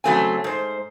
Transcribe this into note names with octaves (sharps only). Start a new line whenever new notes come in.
C#3 F#3 A3 C4 G#5
G#2 C5